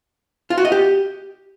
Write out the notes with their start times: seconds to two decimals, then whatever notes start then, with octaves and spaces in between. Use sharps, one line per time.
0.50 F4
0.58 F#4
0.65 D#5
0.72 G4